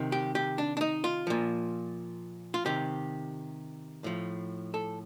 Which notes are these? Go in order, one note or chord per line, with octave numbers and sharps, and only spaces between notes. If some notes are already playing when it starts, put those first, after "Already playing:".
Already playing: C3 D#3
G4
G4
D4
D4
D#4
F4
A#2 F3
F4
C3 D#3 G4
A2 F3
A4